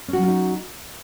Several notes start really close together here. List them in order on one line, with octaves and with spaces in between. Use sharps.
C#4 F#4 F#3 F4 D#4